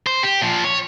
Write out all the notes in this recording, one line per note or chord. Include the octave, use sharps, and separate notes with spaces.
C5
G4
A#2 F3
C#5